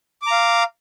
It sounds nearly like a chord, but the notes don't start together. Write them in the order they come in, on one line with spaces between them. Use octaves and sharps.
D6 A#5 F5